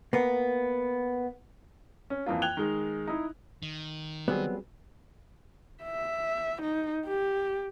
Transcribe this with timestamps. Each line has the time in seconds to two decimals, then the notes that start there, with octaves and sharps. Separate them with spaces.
0.13 A#3 B3
2.10 C#4
2.26 F2 E3 A#3 F4
2.42 G5 F#6 G#6 F7 G7
2.57 D#3 G#3
3.07 D#4 E4
3.63 D#3
4.28 F#3 G3 B3 C4 G#4
5.83 E5
6.62 D#4
7.06 G4